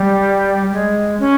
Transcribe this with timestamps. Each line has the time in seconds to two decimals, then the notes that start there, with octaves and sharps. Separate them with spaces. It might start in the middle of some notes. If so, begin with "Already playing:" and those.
Already playing: G3
0.72 G#3
1.20 C#4